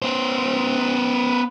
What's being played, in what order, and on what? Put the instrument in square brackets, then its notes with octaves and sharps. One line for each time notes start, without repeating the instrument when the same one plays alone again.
[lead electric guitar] B3 C5